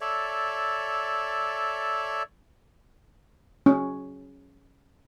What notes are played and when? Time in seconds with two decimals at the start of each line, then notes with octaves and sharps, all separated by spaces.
0.01 A4 C#5 D5 E5
3.66 C#4